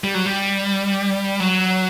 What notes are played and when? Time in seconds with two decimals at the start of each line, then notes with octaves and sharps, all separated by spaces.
0.04 G3
0.14 F#3
0.26 G3
1.40 F#3